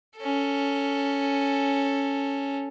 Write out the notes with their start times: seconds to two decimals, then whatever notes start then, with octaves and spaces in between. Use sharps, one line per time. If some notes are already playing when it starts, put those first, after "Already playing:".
0.18 C#4 A4